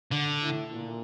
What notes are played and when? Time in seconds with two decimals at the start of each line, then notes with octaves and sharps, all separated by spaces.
0.11 D3
0.42 A2
0.73 A#2